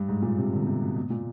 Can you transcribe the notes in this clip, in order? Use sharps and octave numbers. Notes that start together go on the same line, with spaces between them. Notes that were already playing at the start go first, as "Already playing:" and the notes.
Already playing: G2
G#2
A#2
C3
D3
B2
C3
B2
B2
A#2